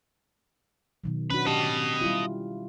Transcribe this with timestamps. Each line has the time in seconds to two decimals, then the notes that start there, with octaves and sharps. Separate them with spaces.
1.04 B2 D#3 F#3
1.30 C#4 D4 F#4 B4 B5
1.46 C#4 G4 D#5 A5
2.01 G3 E4 F4